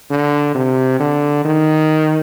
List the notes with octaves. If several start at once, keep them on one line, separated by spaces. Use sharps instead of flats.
D3
C3
D3
D#3